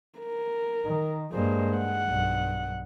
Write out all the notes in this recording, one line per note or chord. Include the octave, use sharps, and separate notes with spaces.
A#4
D#3
G2 G#3 A#3 C5
F#5
B1 G2